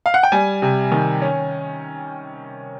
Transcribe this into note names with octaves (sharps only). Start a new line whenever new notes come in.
F5
F#5
G5
G3 G#5
C3
D#3
C#4